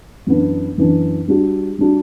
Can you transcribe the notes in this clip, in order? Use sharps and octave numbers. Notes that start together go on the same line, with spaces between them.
F#2 E3 B3 D4
F#2 E3 B3 D4
G3 D4 F#4
G3 D4 F#4